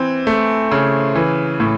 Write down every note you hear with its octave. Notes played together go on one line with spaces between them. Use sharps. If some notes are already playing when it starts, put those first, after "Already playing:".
Already playing: E3 C4
A3
C#3
E3
A2